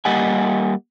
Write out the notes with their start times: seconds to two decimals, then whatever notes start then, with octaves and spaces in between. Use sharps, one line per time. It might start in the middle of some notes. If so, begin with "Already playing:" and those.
0.05 G3 A#3 G4 D#5 F#5 G#5